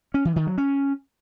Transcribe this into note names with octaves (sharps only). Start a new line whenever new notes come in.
C#4
E3
D#3
F#3
C#4